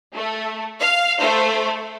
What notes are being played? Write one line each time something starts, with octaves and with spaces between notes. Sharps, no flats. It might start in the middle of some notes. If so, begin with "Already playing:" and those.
A3
F5
A3 C5